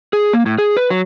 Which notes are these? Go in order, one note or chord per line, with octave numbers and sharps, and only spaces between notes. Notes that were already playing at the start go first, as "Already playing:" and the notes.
G#4
A#3
A2
G#4
B4
F#3